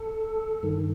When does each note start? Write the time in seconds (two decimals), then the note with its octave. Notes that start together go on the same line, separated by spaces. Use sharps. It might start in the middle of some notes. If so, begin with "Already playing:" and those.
Already playing: A4
0.63 G2 D#3